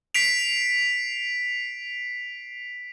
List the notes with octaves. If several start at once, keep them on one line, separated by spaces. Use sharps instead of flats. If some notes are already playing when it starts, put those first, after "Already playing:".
B6 C7 D7 F7